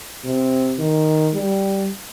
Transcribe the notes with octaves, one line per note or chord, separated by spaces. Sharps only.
C3
D#3
G3